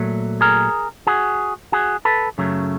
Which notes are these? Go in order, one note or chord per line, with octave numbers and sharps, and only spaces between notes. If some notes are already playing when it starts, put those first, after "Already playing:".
Already playing: A#2 F#3 A3
G#4 A#4
F#4 G#4
F#4 G#4
A4 B4
F#2 C#3 F#3 A3